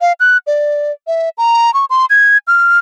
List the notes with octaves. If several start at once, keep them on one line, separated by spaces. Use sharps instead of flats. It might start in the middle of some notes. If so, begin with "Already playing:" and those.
F5
F#6
D5
E5
A#5
C#6
C6
G#6
F6